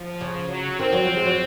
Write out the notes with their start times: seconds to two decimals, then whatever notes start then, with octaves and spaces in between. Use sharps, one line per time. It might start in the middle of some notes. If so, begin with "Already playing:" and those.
Already playing: F3
0.21 C#3
0.49 F#3
0.79 D#3 C4
0.92 F#3
1.07 F3
1.17 G#3
1.26 F#3